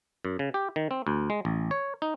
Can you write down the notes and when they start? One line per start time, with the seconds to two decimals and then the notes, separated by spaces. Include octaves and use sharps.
0.25 F#2
0.39 C#3
0.54 G4
0.76 D#3
0.91 C4
1.07 D2
1.30 G#3
1.45 A1
1.71 C#5
2.02 D#4